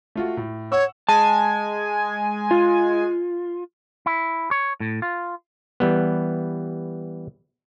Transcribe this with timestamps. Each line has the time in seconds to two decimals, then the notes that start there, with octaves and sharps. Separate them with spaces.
0.16 A3 F4 F#4
0.37 A2
0.72 C#5 F#5 C#6 E6
1.09 G#3 G#5 A5
2.51 F4
4.06 E4
4.51 C#5
4.80 A2
5.02 F4
5.80 E3 G3 B3